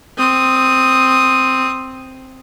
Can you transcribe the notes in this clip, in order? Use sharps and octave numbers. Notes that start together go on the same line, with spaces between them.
C4 D#6